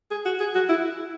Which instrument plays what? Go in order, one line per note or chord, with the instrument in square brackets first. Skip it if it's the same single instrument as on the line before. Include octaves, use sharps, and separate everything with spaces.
[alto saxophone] G#4
F#4
G#4
F#4
E4